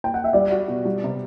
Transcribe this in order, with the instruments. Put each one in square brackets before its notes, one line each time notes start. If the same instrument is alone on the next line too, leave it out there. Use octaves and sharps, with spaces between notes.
[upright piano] G5
F#5
E5
[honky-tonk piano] G3 [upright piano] D5
[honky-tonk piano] F#4
B2
G3
C3